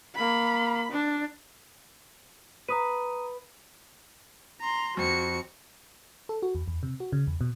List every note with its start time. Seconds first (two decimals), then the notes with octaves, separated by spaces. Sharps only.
0.15 A#3 B5
0.92 D4
2.68 B4 A#5 D#6 D#7
4.61 A#5 C6
4.97 F2 F#4 C#7
6.29 A4
6.43 F#4
6.55 E2
6.68 E2
6.83 C3
7.00 F#4
7.13 C#3
7.27 E2
7.41 B2